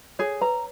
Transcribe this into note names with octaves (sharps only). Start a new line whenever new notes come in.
G#4 C#5
B4 A#5